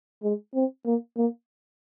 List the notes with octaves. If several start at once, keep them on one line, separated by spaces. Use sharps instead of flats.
G#3
C4
A#3
A#3